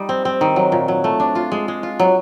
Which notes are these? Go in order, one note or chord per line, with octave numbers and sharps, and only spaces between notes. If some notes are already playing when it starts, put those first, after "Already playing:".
Already playing: G3 D#4
C4
C4
D#3
F#3
A#2
F#3
A3
D4
F4
G#3
G#3
F4
F#3